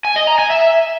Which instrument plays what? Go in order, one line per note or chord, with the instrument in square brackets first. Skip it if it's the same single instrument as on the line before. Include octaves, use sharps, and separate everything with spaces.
[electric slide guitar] G#5
D#5
A#5
G#5
E5